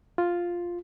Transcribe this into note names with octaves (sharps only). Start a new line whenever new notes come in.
F4